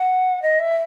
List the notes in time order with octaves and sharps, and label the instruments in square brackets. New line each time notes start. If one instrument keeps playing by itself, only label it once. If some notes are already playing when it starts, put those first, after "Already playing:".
Already playing: [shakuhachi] F#5
D#5
E5